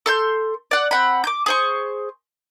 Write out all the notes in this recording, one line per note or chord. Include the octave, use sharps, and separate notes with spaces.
A4 C6 G6
D5 F#5
C4 F#5 B5
D6 G6
G#4 C5 C#6